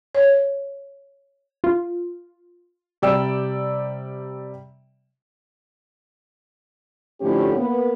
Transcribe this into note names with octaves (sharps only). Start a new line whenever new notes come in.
C#5
F4
C3 G3 D5 G5 E6
A2 D3 F3 C#4 G4
A#3 B3